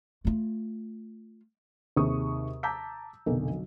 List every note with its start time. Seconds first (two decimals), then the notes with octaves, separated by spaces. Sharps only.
0.25 A3 F4
1.96 D#2 C3 G#4 C#6 D#6
2.63 A5 A#5 D6 E6 G6 B6
3.26 F1 B1 D3 D4 A#4
3.50 F#3